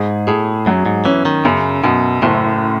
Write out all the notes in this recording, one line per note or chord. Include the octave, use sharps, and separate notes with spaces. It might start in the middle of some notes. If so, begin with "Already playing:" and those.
Already playing: G#2 G#4
A2 G#4
F#2 F#3
G#2
E3 C#4
D#3
F#2 C#3
F#2 B2
F#1 A2